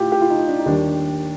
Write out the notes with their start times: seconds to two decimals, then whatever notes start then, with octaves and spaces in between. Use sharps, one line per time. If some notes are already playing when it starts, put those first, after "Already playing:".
Already playing: A2 A3 F4 G4
0.12 G4
0.21 F4
0.30 D#4
0.48 D4
0.59 D#4
0.66 D#2 D#3 G3 D4